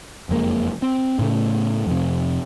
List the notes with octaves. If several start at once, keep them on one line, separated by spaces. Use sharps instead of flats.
F#1 F2 G#3 A#3
C4
A2 C#3 A3
F2 C3